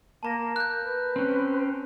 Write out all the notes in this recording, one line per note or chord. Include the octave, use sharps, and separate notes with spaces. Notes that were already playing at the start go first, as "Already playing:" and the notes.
A#3 A5 A#5 A#6
A#4 F#6 G6
B4
C4 C#4